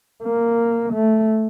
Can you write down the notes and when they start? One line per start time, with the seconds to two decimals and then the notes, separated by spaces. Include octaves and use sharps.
0.23 A#3
0.93 A3